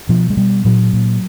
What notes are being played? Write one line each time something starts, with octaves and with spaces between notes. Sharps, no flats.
B2 F3
G#3
B2 G3
A#2 F#3
A#2